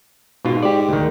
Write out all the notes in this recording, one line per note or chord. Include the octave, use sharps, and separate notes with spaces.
G#2 B2 F4
G#2 G4 D5
D2 D#3